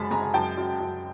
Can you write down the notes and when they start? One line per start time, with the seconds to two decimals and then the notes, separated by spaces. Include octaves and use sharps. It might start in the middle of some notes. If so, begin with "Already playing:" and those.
Already playing: F#2 G#3 G#5 A5 B5
0.11 G#3 G#5 A#5
0.25 G#5
0.34 F#2 G5 A5
0.57 F#2
0.80 F#2